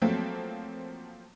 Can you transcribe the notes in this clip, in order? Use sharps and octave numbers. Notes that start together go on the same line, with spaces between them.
F3 F#3 A3 A#3 C4